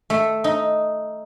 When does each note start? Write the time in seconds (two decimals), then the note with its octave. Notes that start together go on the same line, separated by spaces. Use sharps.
0.10 A3
0.44 D#4